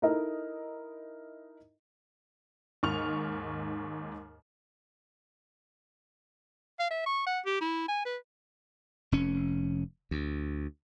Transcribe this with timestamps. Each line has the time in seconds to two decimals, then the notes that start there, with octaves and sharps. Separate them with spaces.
0.02 D#4 E4 A4 A#4 D#5
2.83 D#2 G#2 C#6 F6 F7
6.79 F5
6.91 E5
7.06 C#6
7.26 F#5
7.45 G4
7.61 E4
7.88 G#5
8.05 B4
9.12 F1 C#4
10.11 D2